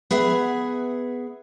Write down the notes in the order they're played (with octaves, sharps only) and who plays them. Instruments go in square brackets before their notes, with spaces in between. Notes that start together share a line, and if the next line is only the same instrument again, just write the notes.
[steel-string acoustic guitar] B3 G#4 E5 F#5